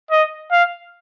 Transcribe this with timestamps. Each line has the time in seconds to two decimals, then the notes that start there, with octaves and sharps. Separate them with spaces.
0.11 D#5
0.52 F5